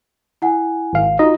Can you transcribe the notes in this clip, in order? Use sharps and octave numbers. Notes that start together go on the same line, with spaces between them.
E4 F#5 G#5
G#1 F5
D#4 F4 F#4 D#5